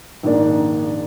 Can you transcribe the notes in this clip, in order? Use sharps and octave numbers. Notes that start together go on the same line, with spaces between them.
A#1 G#2 D#3 A#3 D4